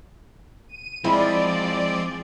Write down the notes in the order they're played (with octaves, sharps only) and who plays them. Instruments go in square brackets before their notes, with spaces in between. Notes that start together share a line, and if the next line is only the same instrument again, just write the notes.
[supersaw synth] D#7
[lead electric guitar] F3 [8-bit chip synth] G#3 C4 [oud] E4 [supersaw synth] D5